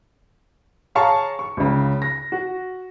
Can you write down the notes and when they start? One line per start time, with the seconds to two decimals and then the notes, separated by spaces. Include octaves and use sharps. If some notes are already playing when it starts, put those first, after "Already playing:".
0.95 G#4 C#5 F5 A5 A#5 C#6
1.39 C#6
1.57 C#2 C#3
2.02 A#6
2.32 F#4